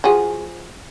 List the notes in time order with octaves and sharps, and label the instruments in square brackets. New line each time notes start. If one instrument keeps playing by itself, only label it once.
[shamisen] F3 F#4 G#4